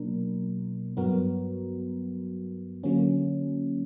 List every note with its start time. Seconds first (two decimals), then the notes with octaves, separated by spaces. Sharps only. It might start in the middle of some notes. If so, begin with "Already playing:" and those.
Already playing: B2 F#3 A#3 D4 A#4
0.97 G2 F#3 B3 F#4 A#4
2.83 D3 F#3 A#3 C#4